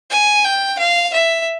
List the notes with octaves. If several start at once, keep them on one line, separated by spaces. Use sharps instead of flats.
G#5
G5
F5
E5